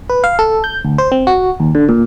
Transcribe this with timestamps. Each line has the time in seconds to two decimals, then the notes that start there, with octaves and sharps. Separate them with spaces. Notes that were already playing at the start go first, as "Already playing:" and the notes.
0.10 B4
0.24 F5
0.39 A4
0.64 G6
0.85 D2
0.98 C5
1.12 C4
1.27 F#4
1.60 D#2
1.75 D3
1.89 A#2